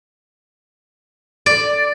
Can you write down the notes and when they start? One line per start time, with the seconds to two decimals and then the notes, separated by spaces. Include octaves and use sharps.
1.46 D5